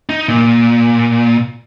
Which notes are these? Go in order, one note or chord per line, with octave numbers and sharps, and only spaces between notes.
D#4
A#2